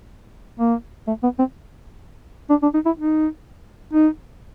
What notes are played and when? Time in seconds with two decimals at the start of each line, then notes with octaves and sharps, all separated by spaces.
0.59 A#3
1.07 A3
1.23 B3
1.39 C4
2.50 D4
2.63 D4
2.74 D#4
2.85 E4
2.98 D#4
3.93 D#4